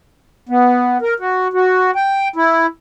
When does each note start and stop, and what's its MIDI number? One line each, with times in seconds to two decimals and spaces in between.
0.49 0.98 59
1.02 1.14 70
1.20 1.48 66
1.53 1.91 66
1.95 2.28 79
2.36 2.66 64